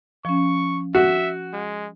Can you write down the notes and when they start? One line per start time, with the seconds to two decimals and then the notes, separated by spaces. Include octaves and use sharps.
0.25 F3 C#4 C#6
0.95 F#4 E5
1.53 G#3